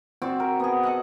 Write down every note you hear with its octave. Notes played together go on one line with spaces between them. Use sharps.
C4 F#4 D5
A#4
B3 G#4
A4 D#5 F#5